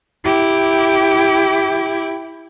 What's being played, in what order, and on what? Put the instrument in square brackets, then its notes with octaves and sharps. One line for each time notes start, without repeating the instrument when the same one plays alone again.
[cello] E4 G4